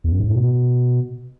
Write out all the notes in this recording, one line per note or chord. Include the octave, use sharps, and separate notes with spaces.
E2
F#2
G#2
A2
B2